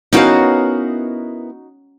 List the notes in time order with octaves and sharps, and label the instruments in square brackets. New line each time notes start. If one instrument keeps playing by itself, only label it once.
[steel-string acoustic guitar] B3 E4 A#4 [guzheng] C#4 G5 [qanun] D#4 F#4 F5